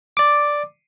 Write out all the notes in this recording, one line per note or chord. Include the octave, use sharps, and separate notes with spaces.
D5 D6